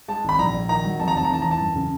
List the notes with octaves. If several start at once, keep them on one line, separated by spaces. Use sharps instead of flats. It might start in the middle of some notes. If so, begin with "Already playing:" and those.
G#3 A5
G#1
B5
A#1 A#5
A#1
D#3 A#5
F#3
F2 A5
A#5
F1 A5
A#5
E2 A5
E2 A#5
A5
F#2
C#3